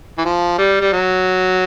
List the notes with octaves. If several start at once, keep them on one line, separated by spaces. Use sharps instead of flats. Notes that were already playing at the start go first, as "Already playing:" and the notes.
E3
F3
G3
G3
F#3